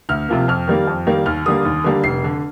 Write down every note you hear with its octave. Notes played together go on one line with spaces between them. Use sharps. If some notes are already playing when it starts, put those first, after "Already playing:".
D2 F6
C3 F3 A#3
F2 F6
D#3 G3 A#3
F2
D#3 G3 A#3
D#2 F6
D3 G3 A#3 D#6
D#2
D3 G3 A#3
F1 C7
D3